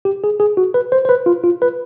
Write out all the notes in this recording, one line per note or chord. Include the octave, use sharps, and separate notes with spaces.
G4
G#4
G#4
F#4
B4
C5
C5
B4
F4
F4
B4